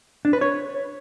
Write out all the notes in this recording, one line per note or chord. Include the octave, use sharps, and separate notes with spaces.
D4
B4
C#5